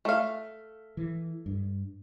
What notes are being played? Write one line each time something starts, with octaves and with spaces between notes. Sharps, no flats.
A3 F5
E3
G2